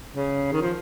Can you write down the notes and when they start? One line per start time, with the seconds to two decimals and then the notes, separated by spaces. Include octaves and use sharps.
0.14 C#3
0.53 D#3
0.62 F3